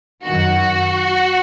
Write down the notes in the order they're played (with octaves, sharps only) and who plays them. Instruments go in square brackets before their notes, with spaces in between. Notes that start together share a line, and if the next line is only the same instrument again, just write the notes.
[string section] F#2 D#3 F#4